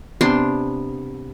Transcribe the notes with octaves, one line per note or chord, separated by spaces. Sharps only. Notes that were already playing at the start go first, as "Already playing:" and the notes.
C3 B3 D4 C6